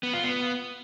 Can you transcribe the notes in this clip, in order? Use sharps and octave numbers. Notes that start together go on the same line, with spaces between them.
B3
F4
B3